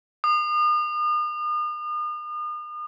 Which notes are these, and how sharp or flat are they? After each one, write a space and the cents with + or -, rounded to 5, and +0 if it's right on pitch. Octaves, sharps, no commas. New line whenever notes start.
D#6 -40